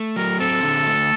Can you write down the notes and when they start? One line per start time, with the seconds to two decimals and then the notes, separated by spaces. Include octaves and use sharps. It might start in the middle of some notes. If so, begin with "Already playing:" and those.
Already playing: A3
0.16 F#3 A#4
0.40 C4 A4
0.63 D3
0.87 A3